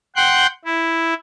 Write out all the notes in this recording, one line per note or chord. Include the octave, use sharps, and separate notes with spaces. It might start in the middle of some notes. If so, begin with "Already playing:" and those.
F#5 G5 C6 F#6 G6
E4